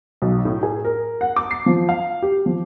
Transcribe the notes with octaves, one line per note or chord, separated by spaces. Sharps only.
B1
A2
G#4
A#4
F#5
D6
C7
F3
F5
G4
F3